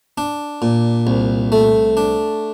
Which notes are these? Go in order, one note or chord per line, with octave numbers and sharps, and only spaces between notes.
D4
A#2
C2
A3
D4